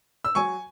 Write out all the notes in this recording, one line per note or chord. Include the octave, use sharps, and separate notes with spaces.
E6
F#3 G#5 C#6